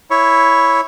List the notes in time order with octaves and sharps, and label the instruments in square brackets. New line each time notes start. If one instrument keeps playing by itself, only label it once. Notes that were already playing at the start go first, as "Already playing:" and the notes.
[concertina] E4 C#5